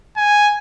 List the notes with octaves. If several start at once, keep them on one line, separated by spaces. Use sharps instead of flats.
G#5